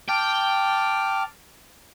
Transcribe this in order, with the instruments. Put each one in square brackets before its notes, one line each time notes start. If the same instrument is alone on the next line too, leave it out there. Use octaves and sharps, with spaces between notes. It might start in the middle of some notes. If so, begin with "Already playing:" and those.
[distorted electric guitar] G5 [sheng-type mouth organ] A5 D6 F6